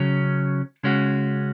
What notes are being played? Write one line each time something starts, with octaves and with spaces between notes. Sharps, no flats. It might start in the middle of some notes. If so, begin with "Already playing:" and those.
Already playing: C#3 F#3 C#4
C#3 G#3 C#4 F#4